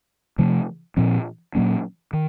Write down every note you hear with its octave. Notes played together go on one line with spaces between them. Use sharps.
C3 F3 A3
A#2 F3 C4
A#2 F#3 A#3 C#4
D#3